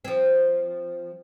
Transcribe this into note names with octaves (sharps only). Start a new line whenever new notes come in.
F3 C4